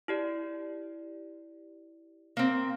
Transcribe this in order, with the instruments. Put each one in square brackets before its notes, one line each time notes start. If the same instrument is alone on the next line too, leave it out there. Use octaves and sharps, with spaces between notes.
[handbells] E4 G4 D5
[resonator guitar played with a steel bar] A#3 C4